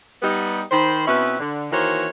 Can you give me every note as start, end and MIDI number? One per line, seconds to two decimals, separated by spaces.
0.22 0.62 55
0.22 0.62 59
0.22 0.62 63
0.71 1.06 51
0.71 1.06 72
0.71 1.06 83
1.07 1.36 47
1.07 1.36 60
1.07 1.36 61
1.07 1.36 64
1.07 1.36 71
1.40 1.67 50
1.72 2.08 51
1.72 2.08 52
1.72 2.08 58
1.72 2.08 66
1.72 2.08 72
1.72 2.08 73